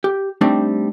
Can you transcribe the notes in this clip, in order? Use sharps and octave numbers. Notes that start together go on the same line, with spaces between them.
G4
G3 A3 C4 D4 D#4